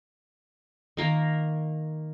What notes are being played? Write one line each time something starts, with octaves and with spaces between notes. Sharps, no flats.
D#3 A#3 A#4